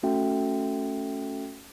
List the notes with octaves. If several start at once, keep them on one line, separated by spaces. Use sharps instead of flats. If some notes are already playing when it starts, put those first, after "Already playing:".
A3 C#4 F#4 A4 E5 G5